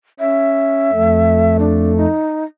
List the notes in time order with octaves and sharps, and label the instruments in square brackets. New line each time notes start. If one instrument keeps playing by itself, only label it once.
[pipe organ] C#4 [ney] E5
[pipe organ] F2 A3
[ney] D4
D#4